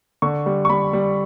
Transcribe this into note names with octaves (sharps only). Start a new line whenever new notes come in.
D3 C#6
G3
C#6
G3 B5
G3